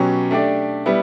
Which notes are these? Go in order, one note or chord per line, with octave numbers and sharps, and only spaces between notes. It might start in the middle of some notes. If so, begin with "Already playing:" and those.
Already playing: B2 F#3 C#4 G4
A3 D4 G4 D5
G3 B3 E4